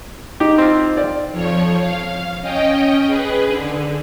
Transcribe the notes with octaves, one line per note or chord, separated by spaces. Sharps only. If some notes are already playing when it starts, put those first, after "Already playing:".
D#4 G4
C4 F4
D5
F2 F3 C#5
F5
C#4 D#5 G5
G#4 B4
D3